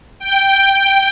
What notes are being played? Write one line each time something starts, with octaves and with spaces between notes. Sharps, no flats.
G5